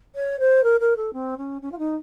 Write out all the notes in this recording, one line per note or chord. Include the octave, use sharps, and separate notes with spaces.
C#5
C5
A#4
A#4
A4
C4
C#4
C#4
F4
D#4